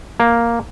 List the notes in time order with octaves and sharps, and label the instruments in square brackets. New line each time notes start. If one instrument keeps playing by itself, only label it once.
[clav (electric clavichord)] A#3